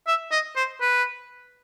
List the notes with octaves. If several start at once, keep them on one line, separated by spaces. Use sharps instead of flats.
E5
D#5
C5
B4